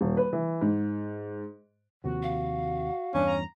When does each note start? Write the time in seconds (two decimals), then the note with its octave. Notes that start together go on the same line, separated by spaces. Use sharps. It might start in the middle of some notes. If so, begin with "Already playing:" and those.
0.01 D#1
0.17 B4
0.33 E3
0.61 G#2
2.04 D#2 C3 F3 F#4
2.23 F5
3.15 E2 G2 C#4 D4
3.27 A#5